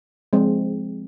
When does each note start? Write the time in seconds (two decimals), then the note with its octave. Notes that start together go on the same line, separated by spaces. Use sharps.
0.33 F3 G#3 C4